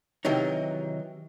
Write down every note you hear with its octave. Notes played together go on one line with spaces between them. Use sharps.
C3 D#3 E3 F#3 D#4